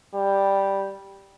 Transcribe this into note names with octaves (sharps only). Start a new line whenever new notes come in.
G3